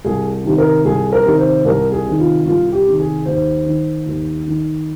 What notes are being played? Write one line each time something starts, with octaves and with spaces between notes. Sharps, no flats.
C2 G#4
C3 D#3
A#4
C2 G#4
A#4
C3 D#3
C5
C2 A#4
G#4
C3 D#3
F4
C2 F4
G4
C3 D#3
G#4
D#2 C5
D#3
D#2
D#3